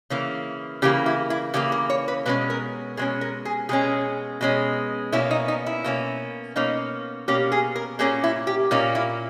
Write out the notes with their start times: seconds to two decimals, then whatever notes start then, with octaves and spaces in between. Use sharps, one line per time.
0.10 C#3 E3 A#3
0.82 C#3 E3 A#3 G4
1.06 E4
1.30 E4
1.54 C#3 E3 A#3 G4
1.72 A#4
1.90 C#5
2.08 B4
2.26 B2 G#3 C#4 B4
2.50 A#4
2.97 B2 G#3 C#4 G#4
3.21 A#4
3.45 G#4
3.69 B2 G#3 C#4 G#4
4.41 B2 G#3 C#4
5.12 B2 A#3 C#4 E4
5.31 D#4
5.48 D#4
5.66 E4
5.84 B2 A#3 C#4
6.56 B2 A#3 C#4 D#4
7.28 B2 A#3 C#4 G4
7.52 G#4
7.76 A#4
7.99 A#2 A#3 C#4 G#4
8.24 E4
8.47 G4
8.71 A#2 A#3 C#4 D#4
8.95 E4